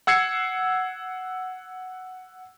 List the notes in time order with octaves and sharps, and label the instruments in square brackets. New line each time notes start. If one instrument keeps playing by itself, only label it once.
[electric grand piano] F#5 E6 G#6 C7 C#7